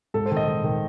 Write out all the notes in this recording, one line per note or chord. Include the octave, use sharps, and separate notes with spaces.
G#2 A4
C5
D#3
D#5
D#3
D#3